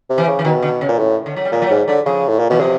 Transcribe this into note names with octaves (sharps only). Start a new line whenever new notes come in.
C3
E3
C#3
E3
B2 D#3
D3
C#3
A#2
A2
D3
F#3
G3
A#2 G#3
F#3
G#2 G3
D3 F#3
C#3 F3
A2
A#2
B2 E3
C3 F3